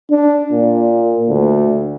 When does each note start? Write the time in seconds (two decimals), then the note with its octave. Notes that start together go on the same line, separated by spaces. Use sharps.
0.11 D4
0.52 A#2
1.29 D2